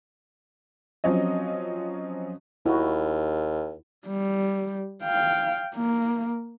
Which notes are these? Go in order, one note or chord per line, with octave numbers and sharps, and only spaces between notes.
F3 F#3 C4 C#4 D#5
D#2 E4 F#4
G3
F5 G5
A#3